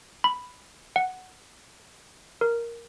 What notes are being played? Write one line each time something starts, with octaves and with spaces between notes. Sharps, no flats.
B5
F#5
A#4